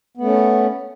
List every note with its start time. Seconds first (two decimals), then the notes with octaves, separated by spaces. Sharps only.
0.17 B3
0.21 A3
0.24 C#4